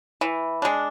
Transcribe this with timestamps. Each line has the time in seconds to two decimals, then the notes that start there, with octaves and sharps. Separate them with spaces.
0.21 E3
0.62 G#3 D4